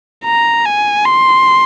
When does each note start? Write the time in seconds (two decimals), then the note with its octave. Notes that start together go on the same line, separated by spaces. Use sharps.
0.24 A#5
0.65 G#5
1.06 C6